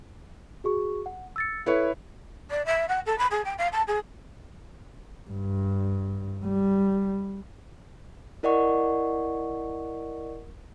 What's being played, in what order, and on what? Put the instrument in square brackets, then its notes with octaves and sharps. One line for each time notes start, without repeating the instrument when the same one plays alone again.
[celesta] F#4 G#4 C#6
F#5
E6 A6 C#7
[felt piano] E4 B4 C#5 [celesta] A4
[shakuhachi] D5
E5
F#5
A4
B5
G#4
G5
F5
A5
G#4
[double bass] G2
G3
[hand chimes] E4 A#4 D5 D#5 F#5 C#6